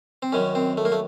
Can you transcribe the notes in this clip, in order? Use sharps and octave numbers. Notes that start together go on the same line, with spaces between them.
C4
F#2 D#3 F#3 C#4
C4
A3
A#3
A3